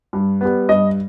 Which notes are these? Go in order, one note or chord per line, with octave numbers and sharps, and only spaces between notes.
G2
G3 B3
G2 D#5